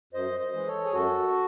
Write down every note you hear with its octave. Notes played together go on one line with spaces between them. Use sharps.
F#2 C5 D#5
C5 D#5
E3 G#3
A4 C#5
G#4
F#2 F#4 A4